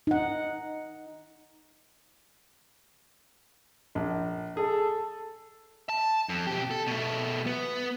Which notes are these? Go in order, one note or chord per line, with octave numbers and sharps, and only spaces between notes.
D#4 F#5
A#1
G#4 A4
A5
F2
B2 G4
A4
B2 A3
B3